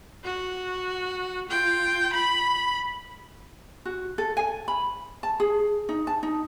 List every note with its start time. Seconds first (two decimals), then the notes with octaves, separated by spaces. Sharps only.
0.24 F#4
1.49 F4 G5
2.14 B5
3.85 F#4
4.18 A4
4.37 G#5
4.68 B5
5.23 A5
5.40 G#4
5.89 D#4
6.07 A5
6.23 D#4